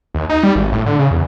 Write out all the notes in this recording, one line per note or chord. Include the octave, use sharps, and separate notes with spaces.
D#2
D#4
G3
G#1
A2
D3
C#3
E2